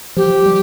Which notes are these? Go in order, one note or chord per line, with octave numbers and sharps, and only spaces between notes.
F3 G4
G3